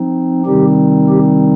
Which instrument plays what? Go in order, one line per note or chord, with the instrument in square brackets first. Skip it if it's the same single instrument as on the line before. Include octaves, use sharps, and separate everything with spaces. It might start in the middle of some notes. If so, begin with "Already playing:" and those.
Already playing: [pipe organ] F3 C4 D#4
C3 D#3 G3 C4 D#4 G4
G4